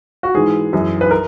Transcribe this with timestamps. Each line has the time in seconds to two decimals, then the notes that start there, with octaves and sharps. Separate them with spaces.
0.23 F#4
0.34 G#2 E3 G#4
0.73 F#2 E3
1.01 B4
1.11 A#4